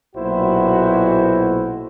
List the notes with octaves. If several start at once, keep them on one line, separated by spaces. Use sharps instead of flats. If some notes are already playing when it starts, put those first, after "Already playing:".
B1 A#2 E4 F#4 C5